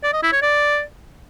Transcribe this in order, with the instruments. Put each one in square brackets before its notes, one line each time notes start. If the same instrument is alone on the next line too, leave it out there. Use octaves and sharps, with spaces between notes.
[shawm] D5
D#5
E4
C#5
D5